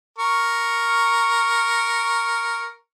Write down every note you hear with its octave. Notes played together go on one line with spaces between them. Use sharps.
A#4 C#6